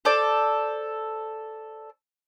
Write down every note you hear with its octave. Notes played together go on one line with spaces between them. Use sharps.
A4 C5 D5